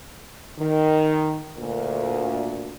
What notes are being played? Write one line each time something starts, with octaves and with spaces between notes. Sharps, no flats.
D#3
D2 A#2